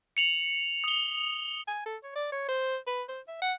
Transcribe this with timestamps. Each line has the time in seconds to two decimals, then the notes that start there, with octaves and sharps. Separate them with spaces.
0.17 C#7 F7 F#7
0.84 D#6 G7
1.68 G#5
1.86 A4
2.04 C#5
2.16 D5
2.32 C#5
2.49 C5
2.87 B4
3.09 C5
3.28 E5
3.42 F#5